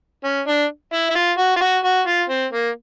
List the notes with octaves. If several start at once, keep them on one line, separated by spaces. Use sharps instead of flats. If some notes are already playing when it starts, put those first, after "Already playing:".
C#4
D4
E4
E4
F4
F#4
F4
F#4
F#4
F4
C4
A#3